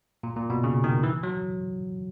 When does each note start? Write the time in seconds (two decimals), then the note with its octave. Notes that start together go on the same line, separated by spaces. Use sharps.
0.23 A#2
0.37 A#2
0.50 B2
0.64 C#3
0.84 D#3
1.03 E3
1.23 F#3